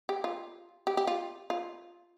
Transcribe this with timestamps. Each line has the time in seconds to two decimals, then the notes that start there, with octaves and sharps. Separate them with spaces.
0.09 G4
0.24 F4
0.87 G4
0.97 G4
1.07 F4
1.50 F4